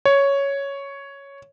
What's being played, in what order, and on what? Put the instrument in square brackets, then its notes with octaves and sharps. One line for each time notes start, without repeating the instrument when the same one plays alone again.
[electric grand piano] C#5